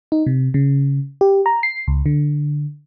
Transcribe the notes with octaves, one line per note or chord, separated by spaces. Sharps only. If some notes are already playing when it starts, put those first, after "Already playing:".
D#4
C3
C#3
G4
A#5
C7
C#2
D3